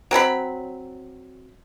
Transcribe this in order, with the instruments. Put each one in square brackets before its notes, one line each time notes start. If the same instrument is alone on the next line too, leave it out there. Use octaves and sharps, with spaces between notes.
[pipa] F#3 C4 A4 B5